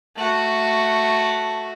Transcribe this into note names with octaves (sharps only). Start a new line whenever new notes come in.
A3 F#4